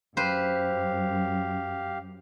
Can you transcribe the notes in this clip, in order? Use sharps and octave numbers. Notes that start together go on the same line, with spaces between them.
F#2 G4 B4 C5 F5